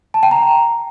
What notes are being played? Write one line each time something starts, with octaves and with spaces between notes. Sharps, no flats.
A5
G5
A#5